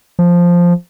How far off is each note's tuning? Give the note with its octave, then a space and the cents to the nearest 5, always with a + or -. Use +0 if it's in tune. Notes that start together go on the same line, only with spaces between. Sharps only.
F3 +0